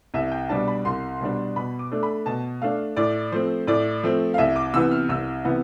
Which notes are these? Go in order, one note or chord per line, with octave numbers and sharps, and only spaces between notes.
C2 E5
G5
B2 G3 D4 A5
B5
C2 C6
B2 G3 D4
B2 B5
D6
A3 D4
B5
B2 A5
A3 D4 F5
A2 D5
F3 A3 C4 C5
A2 D5
F3 A3 C4
F5
C2 E5
D6
C3 E3 B3 E6
F6
C2 E6
C3 E3 B3